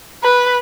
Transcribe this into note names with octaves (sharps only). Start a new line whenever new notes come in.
B4